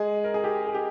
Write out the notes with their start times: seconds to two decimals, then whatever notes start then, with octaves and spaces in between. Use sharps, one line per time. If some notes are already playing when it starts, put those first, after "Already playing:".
Already playing: G#3 G#4
0.24 A#4
0.34 G#4
0.44 G4
0.67 G#4
0.74 G4